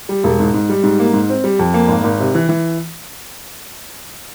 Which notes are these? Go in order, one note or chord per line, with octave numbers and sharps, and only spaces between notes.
G3
E1
G#2
G#2
G3
G#2
A#3
G#2
C4
G3
F2
A#3
G#1
G#1
C3
E3
E3